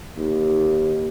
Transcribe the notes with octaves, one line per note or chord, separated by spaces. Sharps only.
D#2